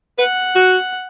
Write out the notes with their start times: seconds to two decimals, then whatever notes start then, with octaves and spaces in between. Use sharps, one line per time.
0.19 B4 F#5
0.55 F#4